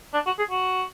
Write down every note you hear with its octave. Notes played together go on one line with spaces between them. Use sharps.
D4
F#4
G#4
F#4